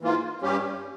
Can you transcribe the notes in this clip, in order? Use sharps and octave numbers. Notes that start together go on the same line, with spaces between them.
G#2 E3 A#3 F4
G2 G3 C#4 G4